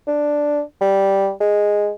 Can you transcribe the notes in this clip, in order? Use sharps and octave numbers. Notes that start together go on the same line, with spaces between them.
D4
G3
G#3